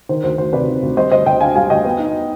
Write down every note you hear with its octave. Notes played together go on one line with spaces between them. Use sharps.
D#3 C5
D2 C5
D2 C5
C3 B4 D5
D#3
D2
G3 C5 D#5
D2 C5 D#5
D2 D#5 G5
D3 F5 G#5
G3 F5 G#5
D2 D#5 G5
B3
D#4